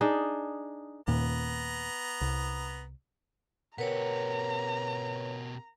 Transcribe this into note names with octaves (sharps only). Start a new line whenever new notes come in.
D4 D#4 G#4
D#2 A#2 B3 A#5
C2
B2 G4 A#4 B4 C#5 F#5 A#5